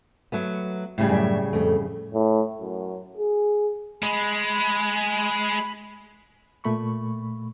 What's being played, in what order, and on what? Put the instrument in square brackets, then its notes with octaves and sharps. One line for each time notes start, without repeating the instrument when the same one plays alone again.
[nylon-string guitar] F#3 A3 B3
A2 C#3 G3
[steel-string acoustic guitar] F#2 D5 E5
F2 A3
[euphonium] A2
F#2
G#4
[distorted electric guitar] G#3 [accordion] B5
[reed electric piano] A#2 A3 B5 C#6